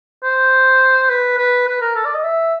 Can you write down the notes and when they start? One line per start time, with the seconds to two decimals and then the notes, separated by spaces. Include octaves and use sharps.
0.24 C5
1.09 B4
1.38 B4
1.68 B4
1.81 A#4
1.96 A4
2.05 D5
2.14 D#5
2.24 E5